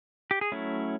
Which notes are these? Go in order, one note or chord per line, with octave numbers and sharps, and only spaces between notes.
G4
G#4
F#3 A3 C#4 E4